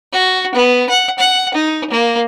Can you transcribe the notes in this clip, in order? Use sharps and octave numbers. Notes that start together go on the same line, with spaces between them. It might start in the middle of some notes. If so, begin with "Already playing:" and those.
F#4
B3
F#5
F#5
D#4
A#3